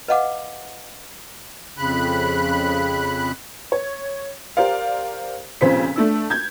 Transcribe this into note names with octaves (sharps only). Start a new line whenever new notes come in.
B4 D#5 F5 F#5 D6
F2 C#3 B5 F#6
C#5
G4 A#4 C5 D5 F5
F1 A#2 C#3 C4 C5 B6
A3 D4 E6
G6 G#6